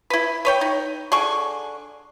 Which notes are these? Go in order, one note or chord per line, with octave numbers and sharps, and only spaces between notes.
E4 B4
B4 C#5 G5
D#4
D3 G#4 C#6